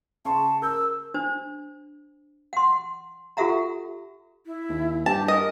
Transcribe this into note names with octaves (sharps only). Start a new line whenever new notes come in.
C#3 A5 C6 C#6
A#4 E6 G6
D4 C5
F#5 C6
F4 G4 A4 E5 F#5 A#5
E4
D#2
G2 G4 A5
A#4 D#5